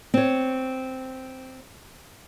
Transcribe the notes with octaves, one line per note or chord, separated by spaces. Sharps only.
C4 C#5